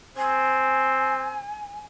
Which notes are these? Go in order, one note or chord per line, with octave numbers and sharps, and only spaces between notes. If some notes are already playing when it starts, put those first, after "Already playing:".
C4 G#5